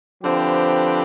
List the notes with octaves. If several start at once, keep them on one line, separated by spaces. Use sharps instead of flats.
D3 F3 C4 G4 B4